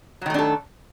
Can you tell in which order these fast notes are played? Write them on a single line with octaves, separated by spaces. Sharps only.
F#3 D#3 A3 D4 A4